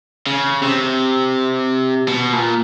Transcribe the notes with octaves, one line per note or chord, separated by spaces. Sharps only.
C#3
C3
B2
A#2